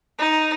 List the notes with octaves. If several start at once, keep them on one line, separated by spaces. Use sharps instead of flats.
D#4